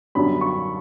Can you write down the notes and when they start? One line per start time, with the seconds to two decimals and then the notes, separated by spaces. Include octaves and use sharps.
0.15 F#2 D3 G3 B3 D4 B5
0.41 C#6